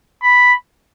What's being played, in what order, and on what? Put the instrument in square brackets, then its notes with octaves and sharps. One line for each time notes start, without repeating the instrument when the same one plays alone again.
[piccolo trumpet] B5